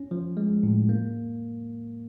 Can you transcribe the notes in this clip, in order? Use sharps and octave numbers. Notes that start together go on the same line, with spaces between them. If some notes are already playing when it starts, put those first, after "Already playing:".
Already playing: C#4
F3
G#3
A2
A#3